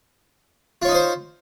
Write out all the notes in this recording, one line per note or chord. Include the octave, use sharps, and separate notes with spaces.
D#4 F4 C5 C#5 D#5